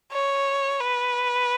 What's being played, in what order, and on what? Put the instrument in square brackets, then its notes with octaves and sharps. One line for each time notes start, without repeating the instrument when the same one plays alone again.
[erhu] C#5
B4